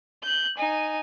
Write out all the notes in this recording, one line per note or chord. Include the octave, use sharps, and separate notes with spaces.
F#6 G6
D#4 G#5